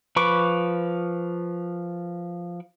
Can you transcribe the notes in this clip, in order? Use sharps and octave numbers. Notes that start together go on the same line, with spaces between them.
F3 B4 B5 C#6 D6